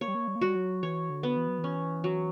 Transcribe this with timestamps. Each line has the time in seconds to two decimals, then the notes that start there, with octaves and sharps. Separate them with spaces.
0.01 A#3 C#5
0.08 G3
0.15 A#3
0.28 G3
0.35 A#3
0.41 G3 F#4
0.55 F#3
0.83 E3 C#5
1.10 D3
1.23 B3
1.36 E3
1.48 F#3
1.58 E3
1.64 C#4
2.04 F#3